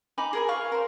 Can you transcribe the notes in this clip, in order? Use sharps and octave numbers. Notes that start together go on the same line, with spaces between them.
D#4 G#5 B5 D6
G#4 A#4 G#5
F4 G#4 F5 C#6
A#4 C5